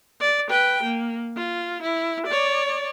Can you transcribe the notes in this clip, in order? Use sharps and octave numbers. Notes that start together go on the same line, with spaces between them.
D5
B4 G5
A#3
F4
E4
C#5 D5